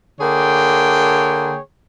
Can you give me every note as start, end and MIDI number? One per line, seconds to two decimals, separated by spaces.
0.20 1.58 50
0.20 1.58 58
0.20 1.58 68
0.20 1.58 73
0.20 1.58 79